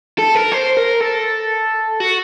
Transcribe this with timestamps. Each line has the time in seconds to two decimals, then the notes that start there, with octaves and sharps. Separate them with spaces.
0.19 A4
0.35 A#4
0.52 C5
0.77 A#4
1.00 A4
2.00 F#4